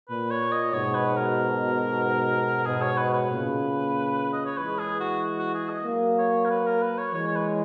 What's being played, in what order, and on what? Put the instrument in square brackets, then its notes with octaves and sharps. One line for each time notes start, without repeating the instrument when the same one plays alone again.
[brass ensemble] A#2 [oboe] B4
[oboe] C#5
D#5
[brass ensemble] G#2 B2 [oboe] C#5
[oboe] B4
A#4
[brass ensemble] G#2 B2 [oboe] G#4
[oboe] C#5
B4
B4
[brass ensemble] A#2 C#3
[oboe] D#5
C#5
[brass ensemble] E3 G#3 [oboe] B4
[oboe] G#4
F#4
F#4
G#4
D#5
[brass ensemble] F#3 A#3
[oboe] C#5
A#4
B4
A#4
B4
C#5
[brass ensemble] E3 G#3 [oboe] C#5
[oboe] C#5
B4